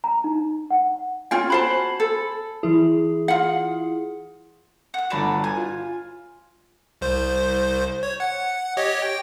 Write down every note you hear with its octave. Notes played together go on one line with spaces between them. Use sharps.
A#5
D#4
F#5
C#4 F4 G5 G#5
F#4 C5 A5 B5
A4
E3 E4 G#4
F4 F#5
F#5 F#6
G1 F#4 D5 B5 E7
G#5
F4
C2 C5
C#5
F#5
G4 C#5 D#5
G5